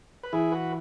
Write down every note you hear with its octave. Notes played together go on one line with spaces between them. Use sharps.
B4
E3 E4 G#4
F#4 B4